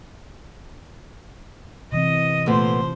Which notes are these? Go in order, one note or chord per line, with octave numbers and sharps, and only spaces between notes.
C3 E3 C4 D#5
A#2 F3 A3 B3 C5